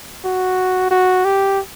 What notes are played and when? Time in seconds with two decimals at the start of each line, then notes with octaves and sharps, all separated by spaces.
0.24 F#4
0.91 F#4
1.25 G4